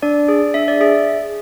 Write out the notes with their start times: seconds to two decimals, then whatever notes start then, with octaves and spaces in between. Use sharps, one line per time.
0.02 D4 D5
0.28 G#4
0.54 D4 E5
0.68 D5
0.81 G#4 E5